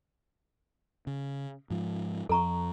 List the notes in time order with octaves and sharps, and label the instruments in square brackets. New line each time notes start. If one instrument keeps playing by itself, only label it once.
[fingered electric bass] C#3
G#2 F3
[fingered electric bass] F2 F3 [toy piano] A4 A#5 C#6